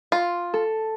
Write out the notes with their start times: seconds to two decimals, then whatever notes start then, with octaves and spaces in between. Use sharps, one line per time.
0.12 F4
0.54 A4